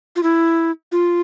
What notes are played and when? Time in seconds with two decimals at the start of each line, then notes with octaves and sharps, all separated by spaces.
0.16 F4
0.23 E4
0.92 F4